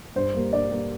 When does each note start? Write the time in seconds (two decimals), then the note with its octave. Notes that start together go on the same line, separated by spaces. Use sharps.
0.16 G2 C5
0.35 G3 A#3
0.53 G2 D5
0.71 G3 A#3